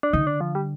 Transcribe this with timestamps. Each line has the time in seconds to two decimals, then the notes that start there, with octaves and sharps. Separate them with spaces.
0.03 D4
0.13 D3 D#4
0.27 D4
0.41 F3
0.55 G3